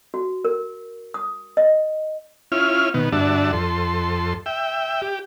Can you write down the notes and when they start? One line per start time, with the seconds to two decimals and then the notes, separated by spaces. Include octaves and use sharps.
0.14 F#4
0.45 A#4
1.14 D#6
1.57 D#5
2.52 C#4 E4 F4 F6
2.94 B2 D#3 B3
3.12 G2 D3 D4 F#4 E5 A5
3.53 F2 A4 C6
4.46 E5 G5
5.02 G4